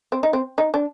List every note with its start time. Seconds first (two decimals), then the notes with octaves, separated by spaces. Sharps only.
0.12 C4
0.23 D#4
0.33 C4
0.58 D#4
0.74 D4